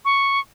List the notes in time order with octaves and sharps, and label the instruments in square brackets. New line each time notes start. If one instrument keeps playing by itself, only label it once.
[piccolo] C#6